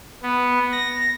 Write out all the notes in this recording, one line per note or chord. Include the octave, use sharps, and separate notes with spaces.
B3
A#6